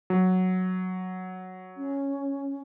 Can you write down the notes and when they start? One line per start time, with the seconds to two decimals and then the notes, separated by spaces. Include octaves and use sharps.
0.10 F#3
1.77 C#4